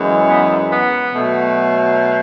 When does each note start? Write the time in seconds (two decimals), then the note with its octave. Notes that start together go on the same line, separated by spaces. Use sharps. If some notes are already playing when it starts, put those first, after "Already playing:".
Already playing: F#2 E3 G#3
0.28 B3
0.71 B3
1.13 B2 F#3 A3